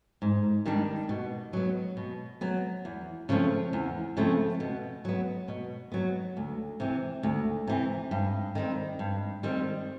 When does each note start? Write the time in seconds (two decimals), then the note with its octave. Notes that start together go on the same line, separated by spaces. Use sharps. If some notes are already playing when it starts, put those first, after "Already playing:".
0.22 G#2
0.66 D#3 G3 B3 D4
1.09 B2
1.53 F#3 B3
1.97 B2
2.41 F#3 B3
2.85 E2
3.29 C#3 F3 A3 C4
3.73 E2
4.17 C#3 F3 A3 C4
4.60 B2
5.05 F#3 B3
5.48 B2
5.92 F#3 B3
6.37 D2
6.80 C3 E3
7.23 D2
7.67 C3 E3
8.11 G2
8.55 D#3 G3 C4
8.99 G2
9.43 D#3 G3 C4